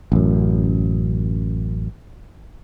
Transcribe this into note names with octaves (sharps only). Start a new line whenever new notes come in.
A1 F#2